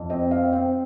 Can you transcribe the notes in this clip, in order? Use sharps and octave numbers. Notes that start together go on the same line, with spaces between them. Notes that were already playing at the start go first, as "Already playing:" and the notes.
Already playing: F2
C4 D#5
C4 F5
C4 G5